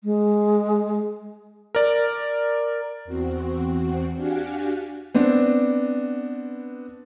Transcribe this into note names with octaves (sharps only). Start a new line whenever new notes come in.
G#3
A#4 D5
E2 C4 F#4
D4 F#4 G4 F5 F#5 G#5
B3 C4 D4